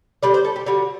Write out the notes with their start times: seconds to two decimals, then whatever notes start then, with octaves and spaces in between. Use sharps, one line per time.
0.23 D3 G3 D5
0.34 C5
0.45 A4
0.56 G4
0.66 D3 G3 F#4